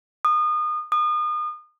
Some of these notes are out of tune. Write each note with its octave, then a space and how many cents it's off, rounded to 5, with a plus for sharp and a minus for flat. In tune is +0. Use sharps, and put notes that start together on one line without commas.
D#6 -30
D#6 -35